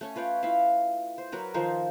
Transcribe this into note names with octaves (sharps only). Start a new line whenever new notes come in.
A3 C#4 A4
F4 B4 C#5 G5
E4 F4 E5 F5
C5
F#3 A#4 B4
D#3 F3 D#4 C5